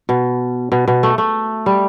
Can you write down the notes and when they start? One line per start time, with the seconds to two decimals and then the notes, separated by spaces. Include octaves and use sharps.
0.09 B2
0.72 B2
0.88 B2
1.03 A3
1.18 A3
1.66 G3